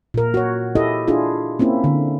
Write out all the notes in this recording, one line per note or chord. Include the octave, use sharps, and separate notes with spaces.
A#2 A#4
F#4 C#5
E4 G4 A4 D#5
D4 E4 F4 G#4
A#3 C4 C#4 E4
D3